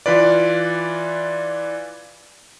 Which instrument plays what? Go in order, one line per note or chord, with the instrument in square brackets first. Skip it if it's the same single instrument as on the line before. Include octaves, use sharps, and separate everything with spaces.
[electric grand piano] E3 F4 B4 D5